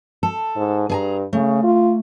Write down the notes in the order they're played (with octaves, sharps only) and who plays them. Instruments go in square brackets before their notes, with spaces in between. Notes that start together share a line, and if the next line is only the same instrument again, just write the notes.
[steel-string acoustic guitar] A4
[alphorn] G#2
[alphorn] G2 [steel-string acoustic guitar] G#4 G#5 A#5
[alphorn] C#3 [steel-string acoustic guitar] A3
[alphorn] F4